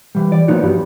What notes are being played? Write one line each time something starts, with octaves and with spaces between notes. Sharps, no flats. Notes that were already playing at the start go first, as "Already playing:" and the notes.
E3 G3
D5
F3 A#3 B3 C#4 D#4 F#4
G2 G3